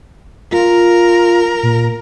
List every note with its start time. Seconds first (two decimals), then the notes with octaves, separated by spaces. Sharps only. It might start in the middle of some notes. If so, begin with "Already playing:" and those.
0.52 F4 A#4
1.63 A#2